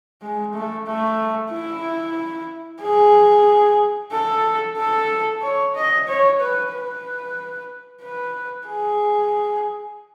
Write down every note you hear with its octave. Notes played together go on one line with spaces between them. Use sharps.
G#3
A3
A3
E4
G#4
A4
A4
C#5
D#5
C#5
B4
B4
B4
G#4